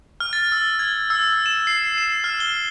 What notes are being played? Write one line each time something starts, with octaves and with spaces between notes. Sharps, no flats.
F6
A6
E6
G#6
E6
E7
C7
E7
F6
G7